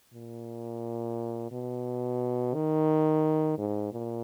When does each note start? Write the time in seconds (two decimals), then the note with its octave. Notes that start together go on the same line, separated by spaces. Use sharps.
0.14 A#2
1.52 B2
2.54 D#3
3.58 G#2
3.93 A#2